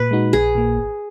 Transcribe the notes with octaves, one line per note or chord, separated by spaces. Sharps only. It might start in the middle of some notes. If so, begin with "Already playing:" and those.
Already playing: A#2 B4
G#3 D#4 F#4
A#1 G#4
A#2 A#3
G#1